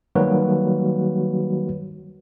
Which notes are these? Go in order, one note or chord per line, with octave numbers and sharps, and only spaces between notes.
D#3 F#3 G3 A#3 F#4 B4